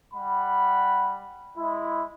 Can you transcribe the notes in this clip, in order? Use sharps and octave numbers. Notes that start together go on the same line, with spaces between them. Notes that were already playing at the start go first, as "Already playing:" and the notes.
G3 F#5 B5
G#3 E4